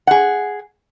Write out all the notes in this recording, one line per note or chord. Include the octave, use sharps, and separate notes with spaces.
G#4 F#5